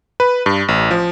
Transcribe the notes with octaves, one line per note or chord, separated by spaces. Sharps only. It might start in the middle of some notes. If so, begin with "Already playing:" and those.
B4
G2
A1
F3